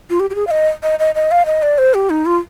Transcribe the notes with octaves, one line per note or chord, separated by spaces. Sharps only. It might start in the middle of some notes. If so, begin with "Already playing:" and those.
F4
G4
G4
G#4
F5
D#5
D#5
D#5
D#5
F5
D#5
D5
C5
G4
D#4
F4